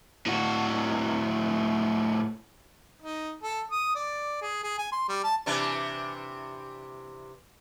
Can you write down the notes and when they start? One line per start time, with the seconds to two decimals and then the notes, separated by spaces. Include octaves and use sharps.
0.27 A2 F#4
3.02 D#4
3.43 A4
3.71 D#6
3.95 D5
4.41 G#4
4.64 G#4
4.78 G#5
4.92 C6
5.08 G3
5.24 A5
5.46 C3 E3 D4